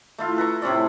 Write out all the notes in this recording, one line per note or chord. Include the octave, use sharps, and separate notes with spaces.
A3 E4 F4
A4 B4 A#5 C#6
A2 C3 C#4 D5